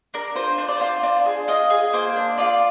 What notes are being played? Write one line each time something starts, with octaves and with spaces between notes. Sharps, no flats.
D4 A#4
F4 C5
D4 C5
D5
F4 C5
D4
G#4
F4 D#5
G#4
A#3 C5
D4
F4 D5